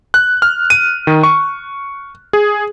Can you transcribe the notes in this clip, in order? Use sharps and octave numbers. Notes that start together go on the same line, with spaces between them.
F#6
F6
D#7
D#3
C#6
G#4